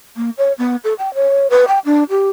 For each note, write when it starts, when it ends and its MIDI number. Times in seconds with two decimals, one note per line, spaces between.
0.17 0.30 58
0.38 0.52 73
0.58 0.76 59
0.84 0.94 69
0.99 1.13 79
1.15 1.47 73
1.50 1.64 71
1.68 1.79 79
1.85 2.04 62
2.10 2.30 67